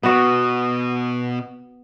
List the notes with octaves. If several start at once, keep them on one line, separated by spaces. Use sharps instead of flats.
B2 B3 F#4